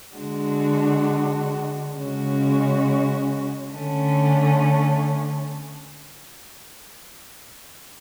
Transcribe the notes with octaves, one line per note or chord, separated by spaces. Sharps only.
D3 G#3 D4 F#4
C#3 G#3 C#4 F#4
D3 A3 C#4